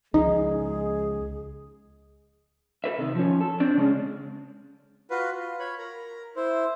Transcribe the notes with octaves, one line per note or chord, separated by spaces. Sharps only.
C#2 F3 G#3 D#4 G#4
A4 B4 E5
C3 D#3
F3 C#4
A4
C4 D4
C#3 G#3 C#4
F4 F#4 B4
F4
C#5 B5
A#4 A#5
E4 C5